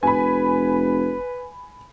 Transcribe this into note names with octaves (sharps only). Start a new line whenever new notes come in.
F1 B4 G#5 B5